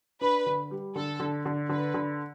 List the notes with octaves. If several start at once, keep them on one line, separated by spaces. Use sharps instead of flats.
D4 B4
D3
G3
D3 A4
D3
D3
D3 B4
D3